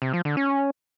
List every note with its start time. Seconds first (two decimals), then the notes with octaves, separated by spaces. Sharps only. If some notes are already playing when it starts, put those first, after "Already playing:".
0.02 C3
0.13 F3
0.25 D3
0.37 C#4